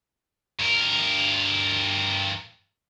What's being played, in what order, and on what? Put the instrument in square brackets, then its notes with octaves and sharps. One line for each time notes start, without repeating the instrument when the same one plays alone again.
[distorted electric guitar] G2 A#4